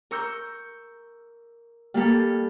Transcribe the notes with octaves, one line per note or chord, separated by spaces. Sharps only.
A#4 C#6 E6 G6
G3 A#3 G4 A4